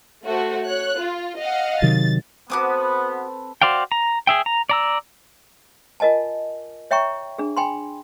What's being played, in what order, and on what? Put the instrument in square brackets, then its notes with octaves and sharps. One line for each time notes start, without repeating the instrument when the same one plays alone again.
[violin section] A3 F#4 C5
C#5 F#6
F4
D#5 F5 F#5
[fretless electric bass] C3 D#3 F#3 [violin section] A6
[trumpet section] B3 [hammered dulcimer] C4 A4 B4 [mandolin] F#4 D6 D#6
[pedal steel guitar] F#4 C5 D5 F5 G5
A#5
G#4 E5 G5
A#5
D5 A#5 E6
[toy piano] F4 A#4 D#5 G#5 A5
C#5 E5 G5 A#5 C#6
D4 G#4
G5 G#5 B5 C6